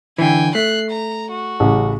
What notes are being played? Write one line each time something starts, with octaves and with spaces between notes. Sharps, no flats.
D3 E3 G5 G#5
A3 F#6 C7
A#5
F#4
A1 C#3